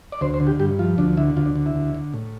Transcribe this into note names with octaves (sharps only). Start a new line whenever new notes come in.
D5
D2 C5
C5
D3
G4
G2 G4
F3 F4
D2 D4
D3 E4
D2 F4
D4
D3
E4
D2
D3
A2